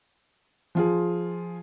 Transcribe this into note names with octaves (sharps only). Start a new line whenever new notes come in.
F3 F4 G#4